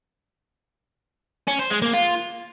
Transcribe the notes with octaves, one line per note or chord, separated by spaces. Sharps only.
C#4
C5
G#3
A#3
F4